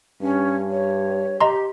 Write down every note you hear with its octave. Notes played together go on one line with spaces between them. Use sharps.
G2 C#4
C#5
G4 D#5 A#5 C6